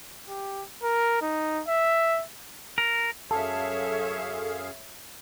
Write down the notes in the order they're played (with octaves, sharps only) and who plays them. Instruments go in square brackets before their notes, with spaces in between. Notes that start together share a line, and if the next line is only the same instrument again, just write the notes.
[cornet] G4
A#4
D#4
E5
[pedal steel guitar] A#4
[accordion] F#2 G#4 F5 [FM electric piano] A4 [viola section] C#5 E5